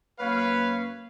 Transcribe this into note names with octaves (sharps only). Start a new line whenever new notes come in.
F#2 A#3 B4 C#5 F5